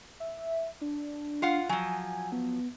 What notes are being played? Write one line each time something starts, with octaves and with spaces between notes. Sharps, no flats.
E5
D4
F4 F5 F#5
F3 F#3 G#5
B3